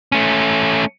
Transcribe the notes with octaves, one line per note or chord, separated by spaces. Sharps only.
A3 C#4